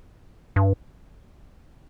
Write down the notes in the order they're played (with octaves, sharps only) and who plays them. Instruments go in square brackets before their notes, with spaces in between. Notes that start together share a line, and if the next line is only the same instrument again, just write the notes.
[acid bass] G2